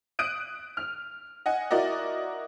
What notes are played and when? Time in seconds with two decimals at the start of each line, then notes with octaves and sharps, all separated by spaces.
0.19 D#6 F#6 D7 D#7
0.77 F6
1.46 D#5 F#5 G#5
1.71 E4 F#4 A#4 D5 D#5